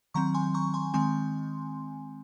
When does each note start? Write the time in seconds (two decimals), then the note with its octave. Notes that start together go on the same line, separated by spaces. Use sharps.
0.14 D#3 F#3 C4 A#5 C#6
0.34 G#5 C6
0.54 A#5 C#6
0.74 G#5 C6
0.94 D#3 G#3 C4 G#5 C6